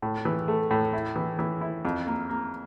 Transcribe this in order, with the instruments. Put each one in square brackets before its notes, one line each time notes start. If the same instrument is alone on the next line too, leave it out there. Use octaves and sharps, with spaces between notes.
[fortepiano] A2
E3
A3
A2
E4
E3
E3
E4
F2
A#3
A#3